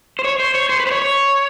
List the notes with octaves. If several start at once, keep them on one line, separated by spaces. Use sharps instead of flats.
C5
C#5
C5
C#5
C5
B4
C5
C#5
C#5